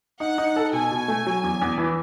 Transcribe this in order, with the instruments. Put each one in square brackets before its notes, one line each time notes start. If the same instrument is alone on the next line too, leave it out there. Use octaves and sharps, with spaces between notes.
[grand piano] D#4 [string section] F#5
[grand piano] D#4
A4
[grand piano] B2 [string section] G#5
[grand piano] B2
A3
F#3
E2
E2
E3